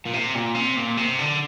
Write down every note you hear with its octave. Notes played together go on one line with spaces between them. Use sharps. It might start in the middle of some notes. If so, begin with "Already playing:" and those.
A#2
C3
A#2
C3
A#2
C3
D3